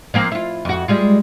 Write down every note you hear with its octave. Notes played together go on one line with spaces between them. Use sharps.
F3 A#3 C4
E4 F4
F2 F#4
G3 G#3 F4